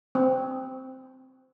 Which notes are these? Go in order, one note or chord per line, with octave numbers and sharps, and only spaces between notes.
C4